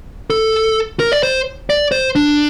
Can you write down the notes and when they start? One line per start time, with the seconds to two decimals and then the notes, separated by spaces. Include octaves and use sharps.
0.30 A4
1.00 A#4
1.12 D5
1.23 C5
1.70 D5
1.92 C5
2.15 D4